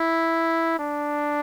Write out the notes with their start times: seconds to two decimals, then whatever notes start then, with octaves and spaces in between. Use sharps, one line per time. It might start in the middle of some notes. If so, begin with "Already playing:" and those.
Already playing: E4
0.79 D4